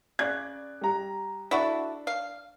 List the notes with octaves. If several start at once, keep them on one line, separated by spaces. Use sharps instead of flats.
C#3 D5 F#6 G#6
G3 A#5
D4 E4 F#4 A4
F5